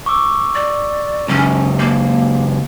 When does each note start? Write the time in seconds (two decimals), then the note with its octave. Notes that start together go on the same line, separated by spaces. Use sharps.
0.06 C#6 D6 E6
0.55 D5
1.28 C#2 F#2 C#4
1.79 A#3